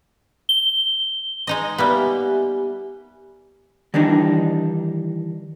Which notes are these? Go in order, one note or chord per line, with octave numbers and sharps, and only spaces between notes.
G7
G#3 D#4 D#5
G3 A#3 B3 G4 E5 G#5
D#3 E3 G3 D4 D#4